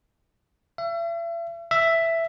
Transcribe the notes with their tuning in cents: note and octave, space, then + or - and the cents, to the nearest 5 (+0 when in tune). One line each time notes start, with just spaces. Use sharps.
E5 +40
E5 +5